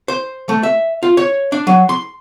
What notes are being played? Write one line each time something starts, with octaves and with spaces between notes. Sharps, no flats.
C5
A3
E5
F4
C#5
D4
F#3
C6